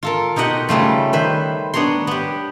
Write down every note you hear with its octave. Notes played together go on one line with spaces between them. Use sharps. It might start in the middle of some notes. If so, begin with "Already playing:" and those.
F4 A4 A#4
B2 D#4 G4 D#5 F#5
C#3 G3 A3 F4
D#3 B4 C5 E5
B3 D4 C#5 A#5 C6
B3 G4